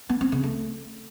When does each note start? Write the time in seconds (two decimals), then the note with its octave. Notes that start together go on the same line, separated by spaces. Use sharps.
0.10 B3
0.21 C4
0.32 C#3
0.43 A3